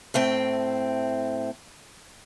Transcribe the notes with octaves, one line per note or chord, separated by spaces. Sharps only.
A2 A3 C4 G5